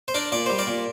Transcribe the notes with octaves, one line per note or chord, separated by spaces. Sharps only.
C5
D4 A#4 D5
A#2 D5
G3 C5
A#4 D5
A#2